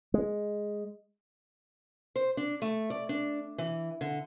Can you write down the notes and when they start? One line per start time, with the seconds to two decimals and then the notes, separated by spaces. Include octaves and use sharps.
0.14 G#3
2.16 C5
2.37 D4
2.62 A3
2.90 D5
3.09 D4
3.58 E3
4.01 D3